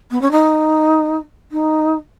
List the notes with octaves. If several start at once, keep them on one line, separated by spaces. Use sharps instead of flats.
B3
C#4
D#4
D#4